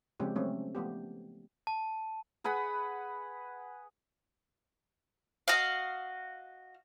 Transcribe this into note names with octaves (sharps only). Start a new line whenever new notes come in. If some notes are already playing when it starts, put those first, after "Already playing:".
C#3 F3 G#3 C4 C#4 G4
F#3 A3 C4 C#4
F3 A3 B3 G4
A5
G#4 B4 F#5 B5
F#4 D#5 F5